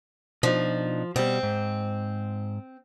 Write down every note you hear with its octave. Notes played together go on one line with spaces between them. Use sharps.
B2 F3 D4 D#4
B2 G3 C4
G#2